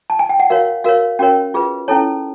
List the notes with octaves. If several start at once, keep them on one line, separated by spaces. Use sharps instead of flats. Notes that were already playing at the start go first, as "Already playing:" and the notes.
A5
G#5
G5
F#5
F#4 A#4 C#5 F5
F#4 A#4 C#5 F5
C#4 F#4 A#4 C#5 G5
F4 G#4 B4
C#4 E4 A4 C#5 A5